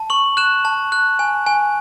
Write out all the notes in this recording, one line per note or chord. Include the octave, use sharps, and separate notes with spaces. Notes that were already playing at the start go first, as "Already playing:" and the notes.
Already playing: A5
C#6 F#7
F#6 E7
A5
F#6
G#5
G#5